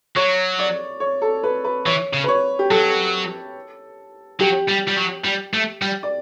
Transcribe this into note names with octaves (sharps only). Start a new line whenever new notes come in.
F#3 C#5
D5
C#5
A4
B4
B4
E3 C#5
C#3
B4
C#5
G4
F#3 A4
F#3 G4
G3
G3
F#3
G3
A3
G3
D5